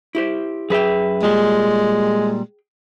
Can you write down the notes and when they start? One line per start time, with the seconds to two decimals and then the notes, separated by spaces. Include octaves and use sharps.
0.15 E4 G4 C5
0.70 F#2 G#4 B4 E5 G5
1.23 A#2 G3 G#3